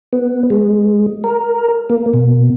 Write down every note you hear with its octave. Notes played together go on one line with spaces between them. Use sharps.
B3
G#3
A#4
A#3
B2